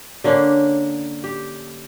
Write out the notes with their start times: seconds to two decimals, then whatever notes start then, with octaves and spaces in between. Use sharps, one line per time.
0.24 D3 A#3 C#4 D4
1.24 G4